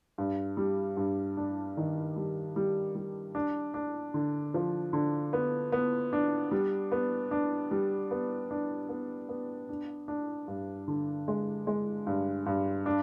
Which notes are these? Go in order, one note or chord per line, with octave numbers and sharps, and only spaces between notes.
G2
G3
G2
D4
D#3
G3
G3
G3
D4
D4
D3
F3
D3
B3
B3
D4
G3
B3
D4
G3
B3
D4
B3
B3
D4
D4
G2
D3
G#3
G#3
G2
G2
D4